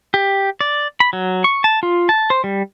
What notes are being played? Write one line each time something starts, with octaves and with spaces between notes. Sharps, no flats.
G4
D5
B5
F#3
C#6
A5
F4
A5
C5
G3